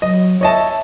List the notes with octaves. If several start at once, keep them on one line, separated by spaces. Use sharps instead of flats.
F#3 D#5
C#5 D#5 E5 A5